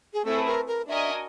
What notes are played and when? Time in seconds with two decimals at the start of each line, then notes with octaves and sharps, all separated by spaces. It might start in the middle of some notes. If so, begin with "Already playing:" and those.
0.14 G#4
0.25 A3 C4 E4 G#4 A4 B4
0.46 A#4
0.67 A#4
0.88 D4 F#4 A#4 D#5 E5 G#5